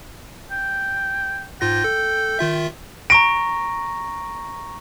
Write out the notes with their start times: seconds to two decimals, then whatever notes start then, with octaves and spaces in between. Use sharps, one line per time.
0.51 G5
1.61 G#2 F4 G5 A#6
1.84 A4
2.39 D#3 F4 E5
3.10 A#5 C#6 A#6 D7